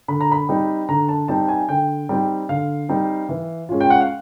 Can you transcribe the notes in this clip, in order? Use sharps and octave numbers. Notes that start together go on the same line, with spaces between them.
D3 B5
A#5
B5
G3 C4 D#4
D3 A#5
A5
G3 C4 D#4 A5
G#5
D3 G5
G3 C4 D#4
D3 F5
G3 C4 D#4
E3
G#3 C#4 F4
G5
F#5
F5